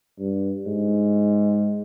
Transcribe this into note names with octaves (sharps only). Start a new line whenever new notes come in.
G2
G#2